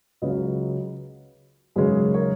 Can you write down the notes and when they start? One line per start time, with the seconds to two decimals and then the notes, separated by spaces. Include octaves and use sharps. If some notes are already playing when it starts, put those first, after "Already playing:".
0.22 C#2 C#3 F#3 B4 D#5
1.76 G#1 F#2 C#3 G#3 G#4 B4
2.14 A#4 C#5